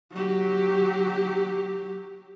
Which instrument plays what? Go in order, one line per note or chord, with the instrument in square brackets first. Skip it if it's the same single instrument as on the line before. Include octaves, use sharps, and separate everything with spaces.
[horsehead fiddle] F#3 G4